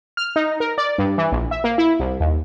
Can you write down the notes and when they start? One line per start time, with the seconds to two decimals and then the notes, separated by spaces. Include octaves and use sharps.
0.17 F6
0.36 D#4
0.60 A#4
0.78 D5
0.98 G2
1.18 E3
1.32 A#1
1.51 E5
1.64 A#3
1.78 E4
2.00 C2
2.20 D#2